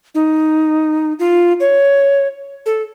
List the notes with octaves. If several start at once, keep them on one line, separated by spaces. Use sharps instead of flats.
D#4
F4
C#5
A4